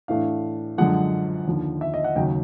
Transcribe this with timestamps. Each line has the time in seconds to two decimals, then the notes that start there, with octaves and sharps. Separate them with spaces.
0.08 A2 E3 A3 D4 F5
0.78 F#2 D3 F3 G#3 F#5
1.47 D#2 D3 F3
1.81 E5
1.94 D#5
2.04 F#5
2.16 D#2 C#3 F#3 G5